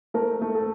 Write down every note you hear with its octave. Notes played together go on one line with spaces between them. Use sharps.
A3 A#4
A3
A4